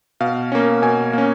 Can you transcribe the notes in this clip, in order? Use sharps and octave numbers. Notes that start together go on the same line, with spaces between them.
B2 F5
A#3 C#4
B2 G#5
A#3 C#4